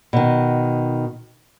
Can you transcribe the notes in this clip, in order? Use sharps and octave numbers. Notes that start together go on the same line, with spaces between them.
B2 D#3